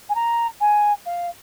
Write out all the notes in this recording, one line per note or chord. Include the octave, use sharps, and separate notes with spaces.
G#5
A#5
G#5
F5